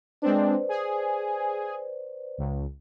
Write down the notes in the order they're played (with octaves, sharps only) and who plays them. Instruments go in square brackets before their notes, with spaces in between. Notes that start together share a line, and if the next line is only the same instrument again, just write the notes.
[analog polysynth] G#3 C4 D4 [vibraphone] B4 C5 D5
[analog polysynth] G#4
C#2